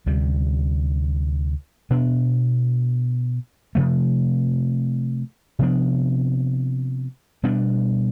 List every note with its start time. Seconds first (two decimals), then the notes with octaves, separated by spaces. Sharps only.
0.06 D2 C3 G3
1.90 B2 B3 D4
3.75 C3 F3 A3
5.59 C3 F3 B3 D4
7.43 B2 G3 B3 D4